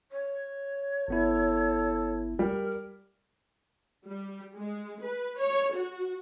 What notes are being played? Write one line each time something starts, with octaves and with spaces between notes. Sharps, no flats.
C#5
G1 B3 E4 A4
G3 A#4
G3
G#3
B4
C#5
F#4